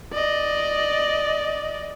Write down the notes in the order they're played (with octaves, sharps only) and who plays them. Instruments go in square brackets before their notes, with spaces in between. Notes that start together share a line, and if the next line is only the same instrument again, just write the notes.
[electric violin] D5 D#5